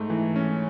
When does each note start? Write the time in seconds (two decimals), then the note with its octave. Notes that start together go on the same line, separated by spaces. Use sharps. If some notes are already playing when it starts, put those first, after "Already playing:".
Already playing: G#2 A3
0.10 E3
0.36 C#4